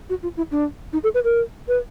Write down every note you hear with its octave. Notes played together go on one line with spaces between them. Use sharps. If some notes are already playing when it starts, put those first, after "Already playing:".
F#4
F4
E4
D4
D#4
A4
B4
A#4
B4